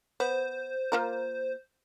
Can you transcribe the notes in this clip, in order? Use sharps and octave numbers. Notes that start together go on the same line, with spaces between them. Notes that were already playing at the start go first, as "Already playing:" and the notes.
B3 C5
A#3 F4 A#4